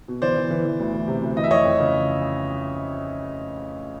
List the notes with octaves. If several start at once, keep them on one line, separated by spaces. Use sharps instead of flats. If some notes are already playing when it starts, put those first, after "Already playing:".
B2
E3 C5 D5
E3
E3
E3
D2
E3
C3
D2
E3 D#5
E5
F2 C#5 D#5
F2
C#3